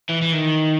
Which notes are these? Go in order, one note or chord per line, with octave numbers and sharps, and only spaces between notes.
E3
E3
D#3